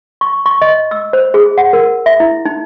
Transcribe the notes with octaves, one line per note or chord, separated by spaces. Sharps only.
C#6
C#6
D#5
E6
C5
G#4
F#5
A#4
E5
E4
D#4